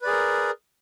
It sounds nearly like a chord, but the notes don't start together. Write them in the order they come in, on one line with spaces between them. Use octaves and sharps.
B4 D5 G#4 A#4